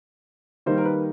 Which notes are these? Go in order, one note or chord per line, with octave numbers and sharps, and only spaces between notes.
D#3 G3 A#3 D#4 C5
A#4
B4